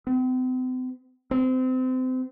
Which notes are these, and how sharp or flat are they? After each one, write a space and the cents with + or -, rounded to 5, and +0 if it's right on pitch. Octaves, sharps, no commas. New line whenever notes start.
C4 -45
C4 -30